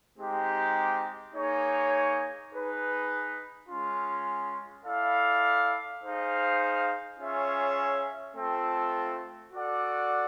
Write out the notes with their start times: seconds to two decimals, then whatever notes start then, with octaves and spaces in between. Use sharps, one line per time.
0.17 G#3 C4 D#4 G4
1.34 A#3 D#4 G#4 C#5
2.51 D#4 G#4 B4
3.68 G#3 C#4 F4
4.84 E4 A4 D5 F5
6.01 D#4 G#4 C5 F5
7.18 C#4 F4 G#4 C#5 E5
8.35 A3 C4 F4 A4
9.52 F#4 A4 D5 F#5